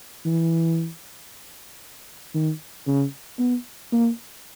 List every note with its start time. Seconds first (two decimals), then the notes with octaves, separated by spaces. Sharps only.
0.25 E3
2.34 D#3
2.87 C#3
3.39 B3
3.93 A#3